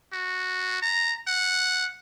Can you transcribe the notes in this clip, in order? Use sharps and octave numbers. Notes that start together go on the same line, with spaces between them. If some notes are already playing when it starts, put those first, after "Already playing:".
F#4
A#5
F#5